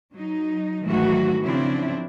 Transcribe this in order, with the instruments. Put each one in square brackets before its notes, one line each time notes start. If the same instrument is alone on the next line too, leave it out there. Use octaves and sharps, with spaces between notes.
[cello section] F#3 D#4
G#2 D#3 E3 F#3 A3 F#4
C#3 F3 C4 D4 E4